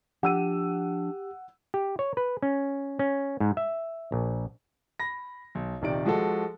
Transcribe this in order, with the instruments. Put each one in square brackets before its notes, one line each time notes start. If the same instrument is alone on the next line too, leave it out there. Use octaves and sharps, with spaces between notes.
[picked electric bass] F3 [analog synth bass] D4 [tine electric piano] G4 [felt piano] F#5 E6 D#7
[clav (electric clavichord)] G4
C#5
B4
C#4
C#4
G#2
E5
A#1
[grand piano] B5 A#6
B1
D#1 C3 D#3 D5 D7
F3 G#3 F#4 A4